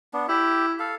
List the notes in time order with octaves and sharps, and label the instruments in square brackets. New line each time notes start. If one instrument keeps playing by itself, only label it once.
[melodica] B3 D4
[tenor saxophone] E4 [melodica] G4
[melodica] A4 F5